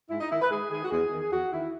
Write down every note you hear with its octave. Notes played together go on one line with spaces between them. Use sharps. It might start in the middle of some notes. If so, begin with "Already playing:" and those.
G#2 E4
D#4
D#3 E4
B4
G#2 G#4
D#3 G#4
F#4
E2 G#4
D#3
E2 F#4
D#3 E4